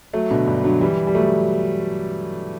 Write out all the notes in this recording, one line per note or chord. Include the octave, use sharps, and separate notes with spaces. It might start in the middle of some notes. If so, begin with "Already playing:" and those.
F#3 A3
B2 D3
G2
D3 F#3
E3 G3
G3
F#3 A3